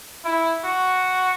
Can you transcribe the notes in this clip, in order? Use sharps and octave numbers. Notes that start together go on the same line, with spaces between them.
E4
F#4